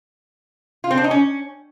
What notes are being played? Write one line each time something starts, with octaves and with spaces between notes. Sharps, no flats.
F4
C4
D4
D#4
C#4